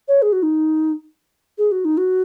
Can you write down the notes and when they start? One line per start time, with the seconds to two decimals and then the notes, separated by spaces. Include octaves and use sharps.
0.08 C#5
0.22 G#4
0.32 F#4
0.43 D#4
1.58 G#4
1.72 F#4
1.85 D#4
1.97 F#4